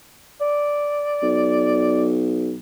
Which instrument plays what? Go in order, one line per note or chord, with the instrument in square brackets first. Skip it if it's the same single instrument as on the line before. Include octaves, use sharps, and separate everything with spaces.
[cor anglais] D5
[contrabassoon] B1